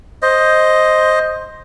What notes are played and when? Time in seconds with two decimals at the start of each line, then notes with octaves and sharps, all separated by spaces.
0.22 C5 D#5